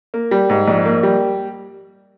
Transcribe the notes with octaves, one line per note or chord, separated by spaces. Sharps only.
A#3
G3
G#2
A#1
A#3
G3